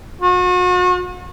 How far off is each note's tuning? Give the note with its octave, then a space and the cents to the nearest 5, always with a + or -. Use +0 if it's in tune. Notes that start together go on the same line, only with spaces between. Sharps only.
F#4 -40